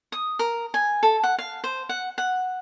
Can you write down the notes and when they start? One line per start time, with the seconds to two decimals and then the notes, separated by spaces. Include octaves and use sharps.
0.12 D#6
0.39 A#4
0.74 G#5
1.03 A4
1.23 F#5
1.38 F5
1.64 C5
1.89 F#5
2.18 F#5